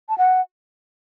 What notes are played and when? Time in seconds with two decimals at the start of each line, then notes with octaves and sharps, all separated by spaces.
0.09 A5
0.18 F#5